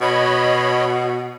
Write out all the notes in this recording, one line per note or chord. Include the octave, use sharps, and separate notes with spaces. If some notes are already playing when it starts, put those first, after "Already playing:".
B2 C#5 D#5 B5